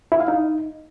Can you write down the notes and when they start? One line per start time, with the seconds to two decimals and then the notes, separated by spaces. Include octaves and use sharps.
0.12 E4
0.20 F5
0.28 D#4